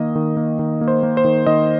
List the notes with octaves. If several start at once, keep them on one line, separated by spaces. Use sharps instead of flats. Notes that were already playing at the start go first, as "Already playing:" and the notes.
Already playing: D#3 A#3 D#5
D#3
A#3
D#3
A#3
C5
A#3
C5
D#3
D#3 D#5